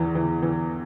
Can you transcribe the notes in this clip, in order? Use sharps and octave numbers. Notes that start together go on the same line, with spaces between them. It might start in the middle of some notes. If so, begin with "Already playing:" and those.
Already playing: E2 E3
E3
E3